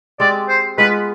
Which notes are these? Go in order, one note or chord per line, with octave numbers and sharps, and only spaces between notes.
G#3 C4 G4 D5
C5
G#3 B3 F4 B4